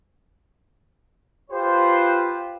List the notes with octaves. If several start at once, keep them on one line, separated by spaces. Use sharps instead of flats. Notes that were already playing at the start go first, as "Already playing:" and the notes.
F4 G4 B4 C5